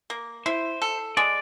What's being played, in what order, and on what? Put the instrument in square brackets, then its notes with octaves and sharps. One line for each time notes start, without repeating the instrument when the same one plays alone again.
[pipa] A#3
[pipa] E4 [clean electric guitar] C5
[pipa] A4
[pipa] G#3 [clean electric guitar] D5